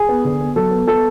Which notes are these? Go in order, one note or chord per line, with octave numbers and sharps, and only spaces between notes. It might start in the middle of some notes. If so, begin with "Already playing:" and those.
Already playing: G#4
B3
D3
B3
F#3 A4
B3
B3 A4